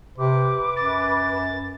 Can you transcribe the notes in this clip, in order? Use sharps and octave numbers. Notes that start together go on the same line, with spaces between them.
C3 B4 D6
F#2 A6